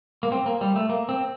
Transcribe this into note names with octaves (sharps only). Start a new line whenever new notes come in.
A#3
C4
A#3
G3
A3
A#3
C4